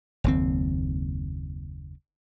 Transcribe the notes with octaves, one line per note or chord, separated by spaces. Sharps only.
F#1 D#2 C4